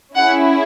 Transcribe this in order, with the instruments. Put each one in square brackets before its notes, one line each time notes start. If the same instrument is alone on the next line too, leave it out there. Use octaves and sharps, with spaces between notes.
[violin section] C#4 E4 G#4 F#5